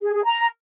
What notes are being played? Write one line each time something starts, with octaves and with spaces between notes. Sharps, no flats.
G#4
G#4
A#5